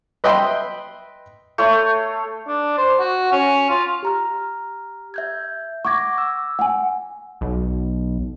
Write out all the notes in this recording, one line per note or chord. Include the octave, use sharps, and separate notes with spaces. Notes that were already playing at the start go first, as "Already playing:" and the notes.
B4 D#5 E5 G5 B5 C6
A3 C#5 C6
D4
C5
F#4
C#4
F4
G4 A#5 F6
E5 G6 G#6
F#5 C#6 D6 G#6 A#6
E6
F#5 G#5
B1